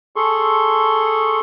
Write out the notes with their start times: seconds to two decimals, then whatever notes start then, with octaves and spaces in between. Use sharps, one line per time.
0.16 G#4 A4 C6 C#6